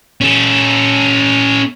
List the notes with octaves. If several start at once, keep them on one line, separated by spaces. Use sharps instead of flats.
C#4 A4